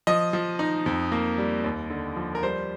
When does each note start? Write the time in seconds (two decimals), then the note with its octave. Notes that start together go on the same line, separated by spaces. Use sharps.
0.07 F3 D#5
0.33 F3
0.59 D#4
0.86 F2
1.12 A#3
1.38 G3
1.64 D#2
1.90 D3
2.16 F3
2.35 A#4
2.43 G3 C5